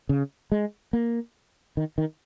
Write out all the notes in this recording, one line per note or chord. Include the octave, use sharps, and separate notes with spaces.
C#3
G#3
A#3
D#3
D#3